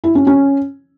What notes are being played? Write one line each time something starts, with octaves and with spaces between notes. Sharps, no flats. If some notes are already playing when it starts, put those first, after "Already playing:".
E4
C#4
C#4